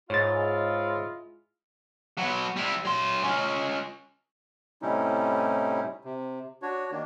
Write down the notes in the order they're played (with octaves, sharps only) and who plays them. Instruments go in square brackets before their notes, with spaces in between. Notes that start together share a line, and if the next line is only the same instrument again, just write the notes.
[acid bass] G#2 [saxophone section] G#3 E4 F4 [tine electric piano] C#5 A6
[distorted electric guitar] F#3 B3
G3 E4
F#3 C6
C#4 F4
[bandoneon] A2 C3 G3 C#4 D#4 E4
C3
D4 F#4 C#5
D#3 A#3 D4